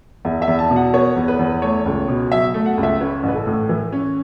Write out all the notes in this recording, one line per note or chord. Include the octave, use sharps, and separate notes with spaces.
E2 E5
E5
E2
A5
B2
F#5
B3 C#5
E2
B4
E2
A3 C#5
C#2
B2
F#3 E5
A3
F#5
C#2
E5
C#4 B4
A1
B4
A4
A2
E3 B4
C#4